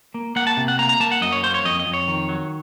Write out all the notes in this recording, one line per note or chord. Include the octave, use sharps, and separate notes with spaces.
A#3
A#3 F#5
A5
C3
F#5
A#3 A#5
A#5
A#3 A5
F#5
F#2 D#5
C#5
A#3 C5
C#5
F2 D#5
D#5
F2
C#5
D#3
F#3